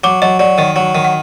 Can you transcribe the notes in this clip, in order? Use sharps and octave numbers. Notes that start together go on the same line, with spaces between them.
F#3 D6
F#3 D#5
F#3 D5
D#3 D#5
F#3
D#3
F#5